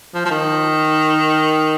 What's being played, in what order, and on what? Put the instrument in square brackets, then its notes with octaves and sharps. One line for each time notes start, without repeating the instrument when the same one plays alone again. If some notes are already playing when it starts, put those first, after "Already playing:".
[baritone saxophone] F3
F3
D#3